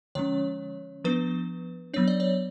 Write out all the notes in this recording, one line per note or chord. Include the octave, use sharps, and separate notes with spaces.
D3 F3 G#3 C#4 C#5
F3 B3 D4 B4
F#3 B3 D4 C#5
D5
C#5